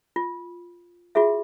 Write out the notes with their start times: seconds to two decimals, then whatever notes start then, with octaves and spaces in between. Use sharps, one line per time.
0.16 F4
1.15 F4 F#4 G#4 E5